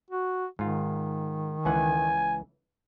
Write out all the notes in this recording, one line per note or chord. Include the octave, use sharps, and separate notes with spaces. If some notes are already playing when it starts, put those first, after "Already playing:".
F#4
G#2 D#3 F4
C#2 E3 F#5 G#5